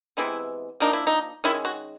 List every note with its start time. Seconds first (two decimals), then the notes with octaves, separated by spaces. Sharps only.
0.17 C3 E3 G#3 B3 E4
0.80 F3 A#3 D4 D#4
0.93 E4
1.07 D#4
1.44 D#3 G#3 C#4 E4
1.65 F#4